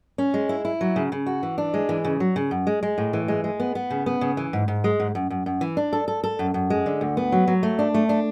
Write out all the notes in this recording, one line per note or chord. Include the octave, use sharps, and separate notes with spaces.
C#4
G#3
E4
E4
F#3
C#3
C#3
F#4
E3
D4
G#3
E3
C#3
F#3
C#3
F#2
G#3
G#3
A2
E3
G#3
G#3
B3
B3
C#3
B3
C#3
E3
G#2
G#2
G#3
G#2
F#2
F#2
F#2
E3
D4
A4
A4
A4
F#2
F#2
G#3
D3
D2
B3
F#3
F#3
A3
D4
A3
D4